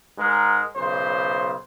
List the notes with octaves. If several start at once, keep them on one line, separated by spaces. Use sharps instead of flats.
G#2 G#3 A#4
B1 C#3 C5